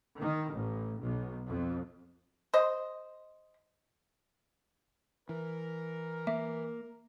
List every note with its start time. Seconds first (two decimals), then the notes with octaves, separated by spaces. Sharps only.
0.19 D#3
0.53 A1
1.02 B1
1.48 F2
2.54 C5 D#5
5.29 E3 A#4
6.27 A#3 E5